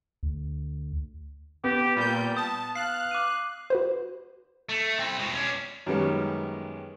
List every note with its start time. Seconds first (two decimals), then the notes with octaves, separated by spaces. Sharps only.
0.23 D2
1.64 B3 G4
1.96 A#2 G3 G6
2.37 A5 D#6
2.76 F5 F#6 C7
3.11 D6 D#7
3.70 F#4 B4 C5
4.69 A3
4.99 C4 E4
5.19 B2 G#3
5.34 C#4 D4
5.86 F#2 D#3 G3 G#3 B3 C#4